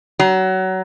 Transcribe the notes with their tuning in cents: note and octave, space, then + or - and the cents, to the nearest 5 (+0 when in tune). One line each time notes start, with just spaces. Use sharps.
F#3 +25